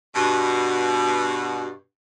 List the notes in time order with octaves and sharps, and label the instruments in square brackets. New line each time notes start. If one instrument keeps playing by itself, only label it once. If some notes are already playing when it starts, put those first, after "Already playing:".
[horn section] G2 B2